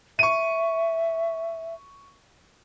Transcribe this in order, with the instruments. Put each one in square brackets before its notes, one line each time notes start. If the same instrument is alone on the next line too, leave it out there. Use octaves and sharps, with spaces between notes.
[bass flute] E5 [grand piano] C#6 D#7